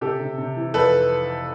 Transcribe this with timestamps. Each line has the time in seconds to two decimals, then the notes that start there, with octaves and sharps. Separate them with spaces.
0.01 C3 G4 A4
0.20 C3
0.38 C3
0.56 E3
0.74 F2 A4 B4